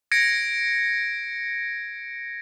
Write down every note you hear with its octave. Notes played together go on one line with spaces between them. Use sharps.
G#6 A#6 C#7 D7